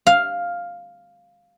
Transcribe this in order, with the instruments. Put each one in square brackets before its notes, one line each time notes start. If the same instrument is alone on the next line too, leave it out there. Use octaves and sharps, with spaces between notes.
[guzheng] F5